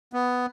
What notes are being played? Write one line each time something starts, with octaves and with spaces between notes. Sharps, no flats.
B3